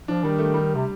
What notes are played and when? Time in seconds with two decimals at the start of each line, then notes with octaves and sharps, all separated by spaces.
0.08 F3 D4
0.24 D#3 G3
0.38 A3
0.54 G3
0.75 C3